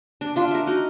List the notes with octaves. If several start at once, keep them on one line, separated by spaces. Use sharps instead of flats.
D4
D4 F4 C6
A#4 E5
D#4 F#4